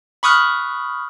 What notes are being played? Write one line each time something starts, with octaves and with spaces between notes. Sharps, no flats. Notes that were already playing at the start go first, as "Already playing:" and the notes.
B5 C#6 D#6 F6 F#6